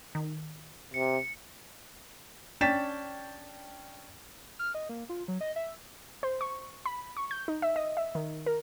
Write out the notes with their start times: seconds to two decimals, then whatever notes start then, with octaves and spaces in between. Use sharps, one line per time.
0.15 D#3
0.94 C3 C#7
2.61 C#4 D4 G5 A6 B6 E7
4.59 F6
4.75 D#5
4.89 A#3
5.09 F4
5.28 F#3
5.41 D#5
5.56 E5
6.23 C5
6.41 C#6
6.86 B5
7.17 C#6
7.31 G6
7.48 D#4
7.62 E5
7.76 D#5
7.97 E5
8.15 D#3
8.46 A#4